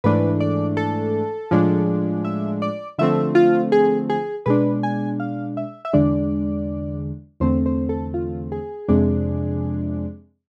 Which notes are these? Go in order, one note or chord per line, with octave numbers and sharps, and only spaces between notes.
G#2 E3 A3 D4 B4
D5
A4
A2 F3 G#3 D4
E5
D5
D3 F3 A3 C4 E5
F4
G#4
G#4
B2 G#3 D4 B4
G#5
F5
E5
E5
E2 D3 G#3 D4 D5
E2 D3 A3 C4 C5
C5
A4
F4
G#4
F2 C3 G#3 D4